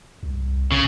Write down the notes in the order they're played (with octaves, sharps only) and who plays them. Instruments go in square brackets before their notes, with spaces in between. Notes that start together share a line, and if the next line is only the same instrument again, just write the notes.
[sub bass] C2
[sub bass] A1 [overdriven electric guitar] C#3